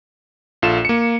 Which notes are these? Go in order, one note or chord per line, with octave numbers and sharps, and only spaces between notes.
A#1 F4 A4 E7
A#3 C#7